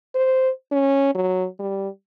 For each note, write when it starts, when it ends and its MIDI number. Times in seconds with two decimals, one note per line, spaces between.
0.15 0.50 72
0.72 1.15 61
1.15 1.46 54
1.59 1.88 55